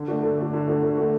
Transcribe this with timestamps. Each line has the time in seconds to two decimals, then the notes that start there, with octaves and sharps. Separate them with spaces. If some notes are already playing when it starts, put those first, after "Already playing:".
Already playing: D3
0.08 A3 D4 F#4
0.23 D3
0.38 A3 D4 F#4
0.53 D3
0.67 A3 D4 F#4
0.83 D3
0.97 A3 D4 F#4